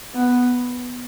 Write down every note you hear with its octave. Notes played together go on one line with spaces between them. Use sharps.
B3